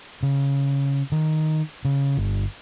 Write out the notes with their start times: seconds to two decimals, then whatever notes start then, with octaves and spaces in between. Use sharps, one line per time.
0.23 C#3
1.12 D#3
1.85 C#3
2.17 G1